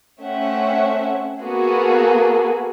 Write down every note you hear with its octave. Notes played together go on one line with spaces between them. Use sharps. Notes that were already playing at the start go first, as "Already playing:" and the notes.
A3 C4 C#4 E5 F#5
A#3 B3 F#4 G#4 A4